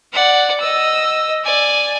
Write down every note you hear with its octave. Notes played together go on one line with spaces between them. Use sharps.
D5 F#5
D#5 E6
D5 G#5